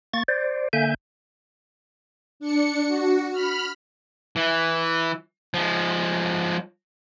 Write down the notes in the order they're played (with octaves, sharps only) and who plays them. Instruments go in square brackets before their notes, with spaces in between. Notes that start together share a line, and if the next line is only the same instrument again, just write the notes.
[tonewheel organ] A#3 C#6 A6
C5 D5
D3 A#3 E5 G#5 G6
[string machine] D4 C#7
F#4
B5 F6
[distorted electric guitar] E3
F3 G#3